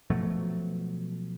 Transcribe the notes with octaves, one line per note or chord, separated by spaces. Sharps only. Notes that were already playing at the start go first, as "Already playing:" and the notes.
B2 F3 F#3 A3